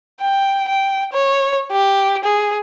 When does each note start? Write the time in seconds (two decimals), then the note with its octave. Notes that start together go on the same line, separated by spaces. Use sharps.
0.21 G5
0.68 G5
1.13 C#5
1.71 G4
2.24 G#4